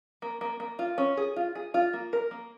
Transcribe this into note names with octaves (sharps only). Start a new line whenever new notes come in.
A#3
A#3
A#3
F4
C#4
G#4
F4
G#4
F4
A#3
A#4
A#3